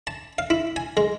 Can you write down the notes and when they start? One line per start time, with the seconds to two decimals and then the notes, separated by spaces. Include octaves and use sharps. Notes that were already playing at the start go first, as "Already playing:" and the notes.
0.07 A5
0.38 F5
0.50 E4
0.76 G#5
0.97 G#3